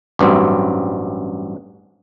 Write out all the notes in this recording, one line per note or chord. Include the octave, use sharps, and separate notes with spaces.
A1 G2 F#3 C4 E4